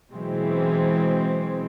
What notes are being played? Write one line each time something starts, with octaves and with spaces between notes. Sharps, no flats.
B2 E3 F#3 G#3 C4